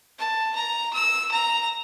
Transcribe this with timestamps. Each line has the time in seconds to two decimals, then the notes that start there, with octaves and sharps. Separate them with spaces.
0.18 A5
0.55 A#5
0.94 E6
1.32 A#5